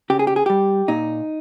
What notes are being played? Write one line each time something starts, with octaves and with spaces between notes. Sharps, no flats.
C#3 G4
G#4
G4
G#4
G3 G4
A#2 D#4